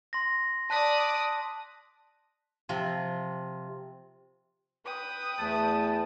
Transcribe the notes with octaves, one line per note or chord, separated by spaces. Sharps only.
C6 A#6
D5 A5 D#6 F#6 B6
C3 F3 F4
B4 G5 D#6
E2 A3 A5